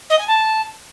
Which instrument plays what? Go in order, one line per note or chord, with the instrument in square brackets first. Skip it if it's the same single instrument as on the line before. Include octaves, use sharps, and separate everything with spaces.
[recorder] D#5
G#5
A5